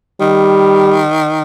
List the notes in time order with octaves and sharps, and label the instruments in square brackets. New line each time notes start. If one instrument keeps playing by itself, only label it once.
[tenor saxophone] D#3 [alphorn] G3